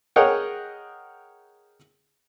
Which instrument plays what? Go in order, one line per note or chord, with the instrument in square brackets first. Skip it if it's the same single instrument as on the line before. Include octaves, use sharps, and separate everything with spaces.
[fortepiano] G#4 A#4 C#5 D#5 F#5 G5